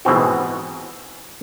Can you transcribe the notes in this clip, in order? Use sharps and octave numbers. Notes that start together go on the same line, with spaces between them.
G#2 B2 E3 C4 F#4